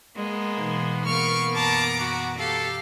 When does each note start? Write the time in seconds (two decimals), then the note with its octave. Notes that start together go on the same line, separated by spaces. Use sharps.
0.16 G#3 A#3 B3
0.58 B2 E3 D#4
1.06 A#3 B3 C#6 F6 D7
1.55 F#2 A5 A#5 D6 A#6
2.01 F#4
2.39 G4 A4 F5